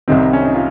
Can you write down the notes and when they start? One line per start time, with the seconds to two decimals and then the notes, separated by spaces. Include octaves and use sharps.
0.08 C2 C3 D#3 C4 D#4
0.33 C#4
0.44 D#4
0.55 F4